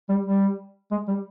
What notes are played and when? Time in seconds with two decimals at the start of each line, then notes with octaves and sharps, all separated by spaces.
0.09 G3
0.26 G3
0.91 G#3
1.07 G3